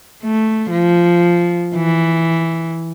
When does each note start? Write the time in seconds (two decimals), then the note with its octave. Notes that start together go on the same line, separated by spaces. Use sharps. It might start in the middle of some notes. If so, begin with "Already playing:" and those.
0.23 A3
0.70 F3
1.76 E3